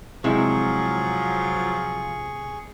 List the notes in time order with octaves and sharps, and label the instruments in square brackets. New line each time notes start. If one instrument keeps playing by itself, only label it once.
[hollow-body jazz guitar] C3 G#3 E4 [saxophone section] F3 [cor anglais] F#3 [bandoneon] G#4 C#6